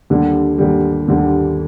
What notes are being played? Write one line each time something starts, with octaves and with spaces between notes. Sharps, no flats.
D#2 D3 G3
D#2 D3 G3
D#2 D3 G3